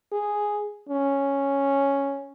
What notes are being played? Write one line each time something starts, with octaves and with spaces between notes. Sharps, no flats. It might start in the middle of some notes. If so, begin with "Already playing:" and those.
G#4
C#4